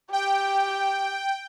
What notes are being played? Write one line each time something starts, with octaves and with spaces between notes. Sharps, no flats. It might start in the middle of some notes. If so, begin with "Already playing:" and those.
G4 G5